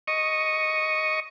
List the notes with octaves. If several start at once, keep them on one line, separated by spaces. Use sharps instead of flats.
D#5 C#6